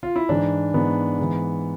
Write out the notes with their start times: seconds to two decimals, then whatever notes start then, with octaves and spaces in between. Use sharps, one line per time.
0.03 F4
0.16 E4
0.29 G#2 E3 D4
0.74 G#2 E3 B3
1.19 G#2 E3